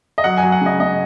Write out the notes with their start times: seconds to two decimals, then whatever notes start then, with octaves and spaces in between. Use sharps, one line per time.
0.18 D#5
0.24 F#3 F#5
0.38 G#5
0.43 F#3
0.52 F#5
0.61 C#3 D#5
0.80 C#3 D#5